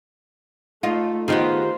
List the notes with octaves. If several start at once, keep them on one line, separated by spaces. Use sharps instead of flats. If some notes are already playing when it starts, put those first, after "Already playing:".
A3 D#4 F4 A4
D#3 B3 D#4 F4 G4 G#4 C5